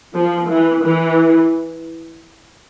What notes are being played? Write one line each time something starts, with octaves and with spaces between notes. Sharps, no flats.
F3
E3
E3